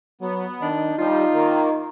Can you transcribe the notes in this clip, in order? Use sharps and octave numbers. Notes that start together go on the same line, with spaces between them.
F#3 B3
D#3 D4 D#4
F3 G3 D#4 F4
D#3 A#3